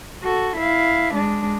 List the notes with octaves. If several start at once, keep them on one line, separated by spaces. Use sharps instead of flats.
F#4 A4
E4 F5
G#3 D4